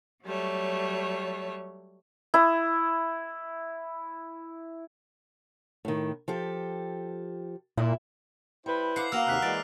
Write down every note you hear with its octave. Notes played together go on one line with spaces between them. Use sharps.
F#3 G3 A3 C#5
E4 D#6
A2 D#3
F3 G4 A4
A#2 E4
G3 E4 B4 C5
A4 F5 F#5 D6 C7
A#3 B3 F#4 F5 E6 F6 F7
D#2 C3 F6 F#6 B6
E3 G#3 D5